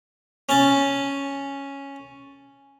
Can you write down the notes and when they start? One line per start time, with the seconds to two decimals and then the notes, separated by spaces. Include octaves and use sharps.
0.49 C#4 A5